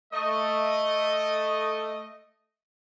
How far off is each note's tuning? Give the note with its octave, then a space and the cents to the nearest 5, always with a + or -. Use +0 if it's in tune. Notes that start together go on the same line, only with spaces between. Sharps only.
A3 +0 D#5 +0